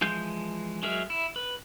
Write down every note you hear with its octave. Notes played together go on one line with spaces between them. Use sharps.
E3 F3 G#3 G6
F#3 G#3 G#4 A#4 E5
E4
B4